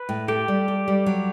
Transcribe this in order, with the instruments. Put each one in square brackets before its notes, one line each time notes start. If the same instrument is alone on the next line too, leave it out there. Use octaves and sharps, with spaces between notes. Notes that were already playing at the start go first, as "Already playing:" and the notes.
Already playing: [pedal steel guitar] B4
[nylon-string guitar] A2
[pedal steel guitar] G4 [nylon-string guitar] A4
[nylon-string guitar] G3
A4
G3
F#3